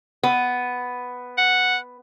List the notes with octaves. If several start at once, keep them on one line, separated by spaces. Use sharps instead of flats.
B3
F#5